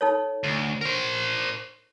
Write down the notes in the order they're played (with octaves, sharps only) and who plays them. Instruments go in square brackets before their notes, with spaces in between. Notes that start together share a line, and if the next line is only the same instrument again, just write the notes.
[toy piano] D#4 A4 C#5
[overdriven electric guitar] D2
A#4 C5